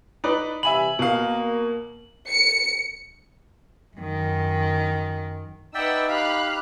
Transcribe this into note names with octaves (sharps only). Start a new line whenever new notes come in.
D#4 B4 D5
C3 E3 G3 E5 G#5 B5 F#7
B2 A#3 F5
C#7
F#2 D#3
D#4 B4 D5 E5 F#5 G5 E6
G4 F5 B5 F#6